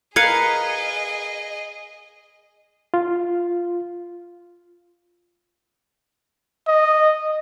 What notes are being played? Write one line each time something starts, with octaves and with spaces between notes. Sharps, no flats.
G#4 A#4 B4 D#5 F5 G#6 C#7
F4
D#5